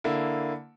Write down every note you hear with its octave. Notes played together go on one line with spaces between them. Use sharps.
D3 A#3 E4